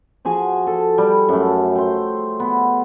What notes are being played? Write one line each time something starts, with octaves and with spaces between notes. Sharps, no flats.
F3 F#4 G#4 G#5
A4
G3
F#2 A3
C5 G5
B3